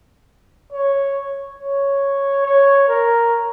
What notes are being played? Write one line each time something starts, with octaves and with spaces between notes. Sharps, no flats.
C#5
C#5
C#5
A#4